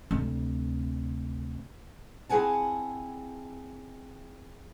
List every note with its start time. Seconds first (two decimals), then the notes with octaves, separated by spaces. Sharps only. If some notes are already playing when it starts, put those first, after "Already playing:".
0.11 D2 C3
2.29 C4 E4 G#4 F#5 G#5 A5